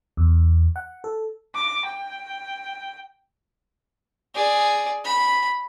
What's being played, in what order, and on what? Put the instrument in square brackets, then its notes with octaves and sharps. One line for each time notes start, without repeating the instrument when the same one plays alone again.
[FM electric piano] E2
F#5
A4
[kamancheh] D6
G5
[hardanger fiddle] G#4 D5
B5